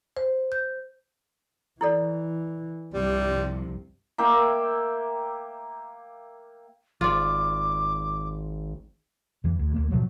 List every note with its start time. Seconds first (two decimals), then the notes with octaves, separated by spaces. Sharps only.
0.17 C5
0.52 G6
1.81 E3 E4 A4 D5
2.94 C2 G2 C3 F3 G3
4.18 A#3 E5 G5 D6
7.01 G#1 F4 D5 D6
9.44 F2 E3
9.59 D2
9.74 D2 G#3 A#3
9.91 G#2 B2 F3 F#3